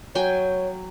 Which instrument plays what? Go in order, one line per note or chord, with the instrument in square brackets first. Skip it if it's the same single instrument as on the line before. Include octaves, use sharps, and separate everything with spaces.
[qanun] F#3 G5 G#5 [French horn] C#5